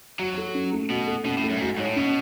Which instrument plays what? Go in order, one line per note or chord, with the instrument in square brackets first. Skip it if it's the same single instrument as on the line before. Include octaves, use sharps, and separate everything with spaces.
[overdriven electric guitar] F#3 [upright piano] F#4
[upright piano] A4
C#4
A3
[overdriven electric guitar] B2 [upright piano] F#4
[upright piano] A4
[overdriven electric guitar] B2 [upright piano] C#4
[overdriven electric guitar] A2
[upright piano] A3
[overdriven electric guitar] F#2
A2
[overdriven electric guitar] G#2 [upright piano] F#4
[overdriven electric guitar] G#2 [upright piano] C#5
[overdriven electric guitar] A2
[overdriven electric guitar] B2 [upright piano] C#4